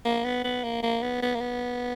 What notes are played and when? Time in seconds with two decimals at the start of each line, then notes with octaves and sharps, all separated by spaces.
0.05 A#3
0.24 B3
0.44 B3
0.64 A#3
0.83 A#3
1.02 B3
1.22 B3
1.35 A#3
1.41 B3